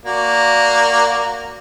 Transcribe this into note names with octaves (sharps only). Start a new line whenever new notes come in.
A#3 F#4 D5